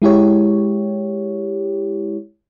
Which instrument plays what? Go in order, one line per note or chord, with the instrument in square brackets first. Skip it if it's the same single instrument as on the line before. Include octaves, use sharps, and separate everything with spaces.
[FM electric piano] G#3 E4 G4 C#5